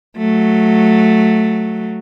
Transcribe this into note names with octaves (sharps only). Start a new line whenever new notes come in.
F#3 A3